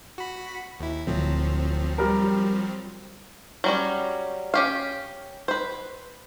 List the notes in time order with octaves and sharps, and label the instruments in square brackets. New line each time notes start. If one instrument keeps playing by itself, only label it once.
[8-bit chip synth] F#4 B5
D#2 E4
[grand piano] D1 [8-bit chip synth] F3 F#3 C4
[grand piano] G3 A#4
[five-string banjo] F#3 G3 C#4
C#4 G4 F5
B4 C5